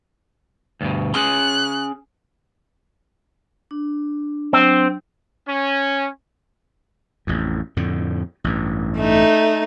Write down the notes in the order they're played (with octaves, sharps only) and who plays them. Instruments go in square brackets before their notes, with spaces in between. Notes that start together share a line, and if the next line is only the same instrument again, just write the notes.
[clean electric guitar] D2 G2 B2
[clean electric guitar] C#4 G#4 C6 [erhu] F#6
[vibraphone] D4
[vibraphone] F#3 D4 C6 [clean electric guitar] C4
[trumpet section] C#4
[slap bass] A1 F2
F2 A2 D3
A1 G2
[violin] A3 D#4